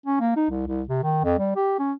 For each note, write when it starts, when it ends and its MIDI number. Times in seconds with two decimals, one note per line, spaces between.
0.06 0.20 61
0.20 0.32 58
0.36 0.47 63
0.50 0.64 36
0.67 0.82 36
0.89 1.00 48
1.03 1.20 51
1.24 1.38 41
1.39 1.53 55
1.56 1.77 67
1.79 1.93 61